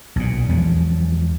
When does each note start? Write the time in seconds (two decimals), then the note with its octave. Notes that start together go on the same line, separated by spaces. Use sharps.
0.16 B1 A#2
0.49 E2 F3 F#3 G#3